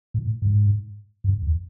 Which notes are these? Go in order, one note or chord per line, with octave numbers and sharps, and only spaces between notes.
A2
G#2
G2
E2